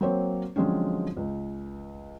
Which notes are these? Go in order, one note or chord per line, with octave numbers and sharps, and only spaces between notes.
F#3 A#3 C4 C5 C#5
D3 F3 F#3 G#3 C4 C#4
C#2